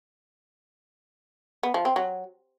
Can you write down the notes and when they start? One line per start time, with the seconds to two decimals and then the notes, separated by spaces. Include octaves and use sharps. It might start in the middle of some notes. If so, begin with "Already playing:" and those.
1.63 B3
1.74 F3
1.85 C4
1.96 F#3